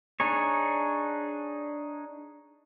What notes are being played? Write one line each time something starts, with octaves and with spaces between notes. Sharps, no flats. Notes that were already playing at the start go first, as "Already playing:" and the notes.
D4 D#4 G#4 C#5